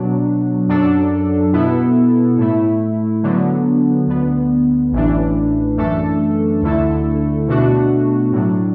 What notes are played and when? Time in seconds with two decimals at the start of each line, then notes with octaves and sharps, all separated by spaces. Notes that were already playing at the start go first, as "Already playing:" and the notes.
Already playing: B2 F#3 D4
0.68 F#2 F#3 D4 A4
1.53 B2 B3 E4 A4
2.37 A2 A3 E4
3.23 D3 F#3 B3
4.07 D2 D3 B3
4.92 A1 A2 E3 D4
5.77 F#2 E3 A3 D4 A4
6.62 D2 D3 A3 E4 A4
7.47 B2 A3 D4 F#4
8.32 A2 F#3 D4